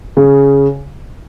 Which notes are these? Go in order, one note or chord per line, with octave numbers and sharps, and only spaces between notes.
C#3